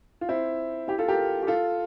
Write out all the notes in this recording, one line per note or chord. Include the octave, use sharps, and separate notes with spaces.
F4
C4 E4
E4 G4
F4 A4
G4 A#4
G4
F4 A4